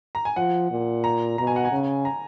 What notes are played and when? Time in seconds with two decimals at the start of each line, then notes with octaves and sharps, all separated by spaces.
0.15 A#5
0.25 G#5
0.36 F3 F#5
0.71 A#2
1.04 A#5
1.38 B2 A#5
1.47 G#5
1.56 F#5
1.65 G#5
1.72 C#3
2.05 A#5